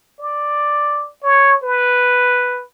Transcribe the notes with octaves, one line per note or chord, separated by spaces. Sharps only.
D5
C#5
B4